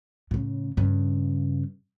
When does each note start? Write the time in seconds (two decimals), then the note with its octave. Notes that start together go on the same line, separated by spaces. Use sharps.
0.31 A2 C#3
0.77 G2 C#3